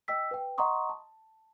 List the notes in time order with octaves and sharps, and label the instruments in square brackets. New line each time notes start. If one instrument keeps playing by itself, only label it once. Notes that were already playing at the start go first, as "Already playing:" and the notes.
[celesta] D#5 G5 E6 B6
B4 G5
D#5 F#5 A#5 C6 C#6 D#6
A5